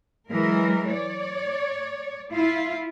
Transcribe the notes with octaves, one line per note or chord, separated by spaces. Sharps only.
E3 F#3 G#3 A#4
C#5 D5
E4 F4